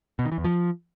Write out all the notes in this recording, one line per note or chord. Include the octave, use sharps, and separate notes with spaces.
B2
D#3
E3
E2
F3